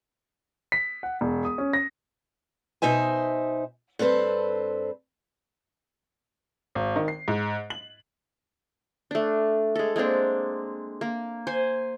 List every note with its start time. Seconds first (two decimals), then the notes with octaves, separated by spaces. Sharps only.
0.72 B6
1.03 F#5
1.21 E1
1.45 D#6
1.58 C#4
1.73 A#6
2.82 B2 D#4 C5 E5 G#5
3.99 G2 C4 A4 B4 C5
6.75 G#1
6.96 D#3
7.08 C7
7.28 G#2
7.70 F#7
9.11 A3 D4
9.75 G#3 A4
9.96 G#3 A#3 C4 D4
11.01 A#3
11.47 C5 G#5